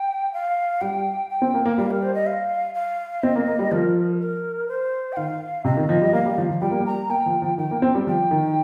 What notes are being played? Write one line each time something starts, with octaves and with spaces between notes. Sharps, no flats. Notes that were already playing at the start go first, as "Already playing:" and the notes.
Already playing: G5
F5
G3 G5
G5
C4
A#3
A#3
G3 F5
A#4
C5
D#5
F5
F5
C4 D#5
A#3
A#3
G3
F3 A#4
A#4
C5
G5
D#3 F5
C3 D#5
D#3
F3
G3
A#3 F5
G3
F3
F3
G3 G5
A#3
G3
A#5
A#3 G5
F3
F3
D#3 G5
A#3
C4
G3
F3 G5
D#3